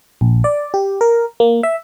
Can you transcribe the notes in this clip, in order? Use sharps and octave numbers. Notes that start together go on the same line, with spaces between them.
A#1
D5
G4
A#4
A#3
E5